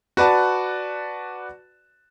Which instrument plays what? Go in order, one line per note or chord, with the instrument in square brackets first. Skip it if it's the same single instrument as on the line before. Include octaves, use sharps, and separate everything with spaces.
[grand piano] F#4 B4 D5 A5